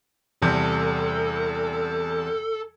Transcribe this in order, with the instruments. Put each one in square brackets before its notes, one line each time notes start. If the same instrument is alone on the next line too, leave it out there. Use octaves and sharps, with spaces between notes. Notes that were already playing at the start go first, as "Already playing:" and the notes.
[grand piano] E2 C3 G3 [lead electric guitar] A4